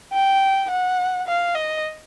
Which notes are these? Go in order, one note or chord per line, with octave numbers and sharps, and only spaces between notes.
G5
F#5
F5
D#5